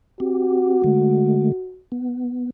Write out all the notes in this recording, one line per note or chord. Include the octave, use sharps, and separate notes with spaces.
C4 F#4 G4
D3 G#3 A3
B3